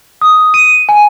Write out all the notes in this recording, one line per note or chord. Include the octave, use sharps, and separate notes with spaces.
D#6
D#7
G#5